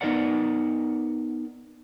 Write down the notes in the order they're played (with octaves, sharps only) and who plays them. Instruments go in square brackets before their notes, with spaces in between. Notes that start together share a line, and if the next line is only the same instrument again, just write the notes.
[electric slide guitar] B3 D#4 A#4 D5 F#5